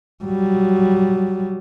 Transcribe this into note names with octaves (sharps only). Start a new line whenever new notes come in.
F#3 G3